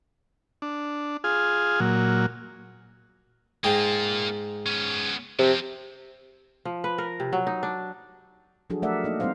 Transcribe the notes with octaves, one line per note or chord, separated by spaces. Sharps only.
D4
F4 G#4
A#2 F#3
G#2 A#3 F4 G#4 G5
B3 C#4
C3 F3 C4
F3
B4
A#4
C3
F#3
D#4
D4
F3 F#3 D4 F#4 G#4 A4
A3 A4 A#4 D5 E5 F#5
A#3 D#4 D#5
G3 B3 C4 D#4 C5 F5